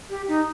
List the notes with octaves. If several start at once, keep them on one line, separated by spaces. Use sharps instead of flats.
G4
D#4